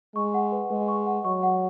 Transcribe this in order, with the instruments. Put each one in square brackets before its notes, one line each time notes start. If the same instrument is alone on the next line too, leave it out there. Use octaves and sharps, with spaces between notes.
[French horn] G#3 [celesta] C#6
[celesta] F#5
B4
[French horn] G#3 [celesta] B4
[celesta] C#6
F#5
[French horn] F#3 [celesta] C#6
[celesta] F#5